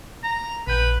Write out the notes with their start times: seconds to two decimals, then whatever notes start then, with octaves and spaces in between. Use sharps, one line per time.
0.23 A#5
0.67 A#1 B4 G6